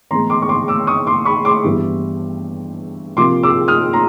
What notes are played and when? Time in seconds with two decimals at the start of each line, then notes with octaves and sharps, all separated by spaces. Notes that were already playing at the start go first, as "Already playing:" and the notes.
0.11 A2 E3 G#3 B3 A#5 C6
0.30 C6 D6
0.42 C#6
0.49 C6 D6
0.68 D6 E6
0.87 C#6 D#6
1.07 C6 D6
1.25 B5 C#6
1.45 C6 D6
1.64 G2 E3 G3 B3
3.17 C3 F3 A#3 C6 D6
3.43 D6 E6
3.68 D#6 F6
3.93 A#5 C6